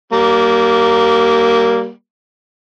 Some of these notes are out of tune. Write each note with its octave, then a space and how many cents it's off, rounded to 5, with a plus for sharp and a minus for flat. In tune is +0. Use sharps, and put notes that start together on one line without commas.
G3 -30 A#3 +0